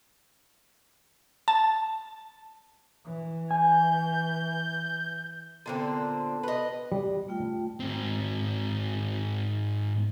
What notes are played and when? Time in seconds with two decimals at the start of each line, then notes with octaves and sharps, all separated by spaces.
1.48 A5
3.06 E3
3.51 G#5 G6
5.66 A#2 D3 B3 C4 A4 A5
6.43 B4 D#5
6.92 G3
7.28 A3 F4 G5
7.80 G#2 C4